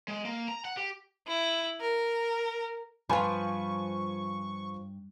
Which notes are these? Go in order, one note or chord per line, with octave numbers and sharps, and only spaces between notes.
G#3
A#3
A#5
F#5
G4
E4
A#4
G2 F3 F4 B4 G#5 B5 C#6